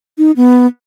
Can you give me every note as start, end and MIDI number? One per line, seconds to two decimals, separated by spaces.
0.18 0.31 63
0.37 0.67 59